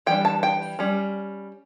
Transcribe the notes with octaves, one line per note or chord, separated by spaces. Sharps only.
E3 G3 D4 G5
A5
G5
G3 C#4